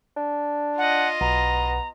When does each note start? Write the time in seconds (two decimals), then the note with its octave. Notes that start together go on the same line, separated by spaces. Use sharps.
0.17 D4
0.78 F4 D#5 F#5
1.21 B1 B3 A#5